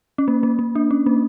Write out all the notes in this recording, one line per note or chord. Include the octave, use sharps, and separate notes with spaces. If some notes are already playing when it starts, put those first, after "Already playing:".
C#4
A#3
A#3
A#3
D4
C#4
A#3